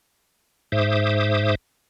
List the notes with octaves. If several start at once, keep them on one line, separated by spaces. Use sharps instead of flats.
G#2 C5 E5 D6 D#6